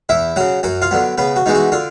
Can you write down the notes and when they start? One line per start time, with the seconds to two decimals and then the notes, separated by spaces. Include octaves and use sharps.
0.09 E2 E4 E5
0.36 C#3 F#3 F#4 F#5
0.63 F#2 F#4 F#5
0.82 F4 F5
0.91 D3 F#3 B3
1.18 C#3 B3 B4
1.36 F#4
1.46 E3 G#3 B3 D#4
1.55 F#4
1.72 D3 F4